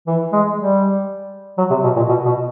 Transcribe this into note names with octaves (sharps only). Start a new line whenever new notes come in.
E3
G#3
G3
F#3
C3
B2
A#2
B2
B2